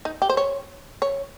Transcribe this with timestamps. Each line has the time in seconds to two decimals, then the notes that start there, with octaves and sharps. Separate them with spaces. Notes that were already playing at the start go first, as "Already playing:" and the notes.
0.05 D#4
0.22 G4
0.30 C5
0.37 C#5
1.02 C#5